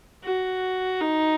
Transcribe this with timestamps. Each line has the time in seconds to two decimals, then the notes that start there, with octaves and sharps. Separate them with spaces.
0.24 F#4
1.01 D#4